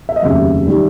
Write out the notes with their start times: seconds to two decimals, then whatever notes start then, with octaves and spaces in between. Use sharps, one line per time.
0.09 E5
0.16 D#5
0.22 F1 D#2 C#3 F#3 E5
0.67 D#3 G3